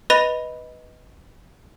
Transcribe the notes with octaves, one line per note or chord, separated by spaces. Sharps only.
B4 D#5 B5 A#6 D#7 F7